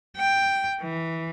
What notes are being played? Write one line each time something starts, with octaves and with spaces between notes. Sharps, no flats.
G5
E3